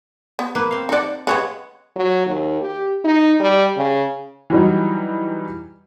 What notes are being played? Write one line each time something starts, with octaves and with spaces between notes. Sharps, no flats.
B3
A#3 B4
C4 F5
D#4 A4 D5 F#5
C#3 G3 G#3 B3 C#5 F#5
F#3
D#2
G4
D#4
G3
C#3
E3 F#3 G3 D#4